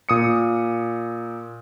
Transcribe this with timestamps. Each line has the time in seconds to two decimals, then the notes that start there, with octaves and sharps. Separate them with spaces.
0.09 A#2 D#6 C#7